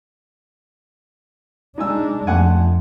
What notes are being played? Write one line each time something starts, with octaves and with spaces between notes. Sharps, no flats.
G#3 D4 D#4 G#5 E6
F2 A3 F#5 G#5